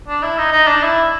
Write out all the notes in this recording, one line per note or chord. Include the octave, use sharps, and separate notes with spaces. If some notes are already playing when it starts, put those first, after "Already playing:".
D4
E4
D#4
D#4
D4
E4